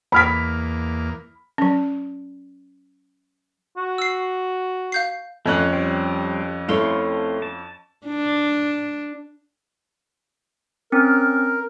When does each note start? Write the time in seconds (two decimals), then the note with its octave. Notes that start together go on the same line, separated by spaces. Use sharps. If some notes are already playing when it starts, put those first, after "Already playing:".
0.12 E2 A#3 B5 F6 B6
1.58 F#3 C#4
3.77 F#4
3.98 E6 C7
4.92 F5 G6 C7
5.46 F2 A3 C#4 F4 F#6
5.73 G3 C4
6.69 A3 C4 E4 C#5 F5 C6
7.42 A5
8.06 D4
10.92 C4 C#4 A#4